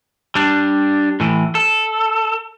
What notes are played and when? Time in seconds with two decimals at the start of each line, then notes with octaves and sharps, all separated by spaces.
0.35 G3 D4
1.20 A2 E3
1.55 A4